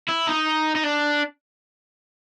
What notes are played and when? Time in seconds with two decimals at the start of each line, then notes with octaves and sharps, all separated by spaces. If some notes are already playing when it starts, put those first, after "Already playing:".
0.09 E4
0.28 D#4
0.75 D#4
0.84 D4